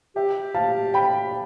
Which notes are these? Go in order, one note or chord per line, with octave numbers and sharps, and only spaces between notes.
G4 E5 G5
F5 A5
G5 B5